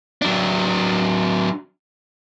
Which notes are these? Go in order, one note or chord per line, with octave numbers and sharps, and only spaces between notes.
F#3 D4